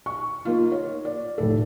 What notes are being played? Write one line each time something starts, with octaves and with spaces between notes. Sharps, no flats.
C#6
A#3 D#4 F4
C#5
D5
F1 A2 A4